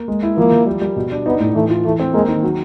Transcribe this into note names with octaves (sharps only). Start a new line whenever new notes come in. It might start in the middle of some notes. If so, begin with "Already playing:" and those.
Already playing: A#3
G#3
E4
F3 A#3
F3
G3
G3
B2
D4
B3 D#4
A2
E3 A3
F4
E3 A3
C4
G#3 A#3
D#3
F#3